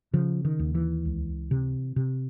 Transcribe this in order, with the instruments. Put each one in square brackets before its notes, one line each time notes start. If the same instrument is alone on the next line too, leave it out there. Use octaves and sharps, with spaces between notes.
[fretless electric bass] C#3 F3
D#3
D#2
E3
C#2
C3
C3